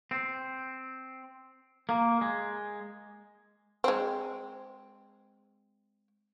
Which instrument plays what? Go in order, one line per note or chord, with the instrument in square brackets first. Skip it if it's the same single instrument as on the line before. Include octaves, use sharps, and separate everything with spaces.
[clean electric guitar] C4
A#3
G#3
[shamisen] G#3 C4